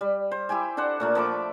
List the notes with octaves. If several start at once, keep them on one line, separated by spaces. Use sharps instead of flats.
G3
C5
E4 G4 G5 G#5
D4 A4 C5 F#5
A#2 A3 A#3
F3 E5 B5 D6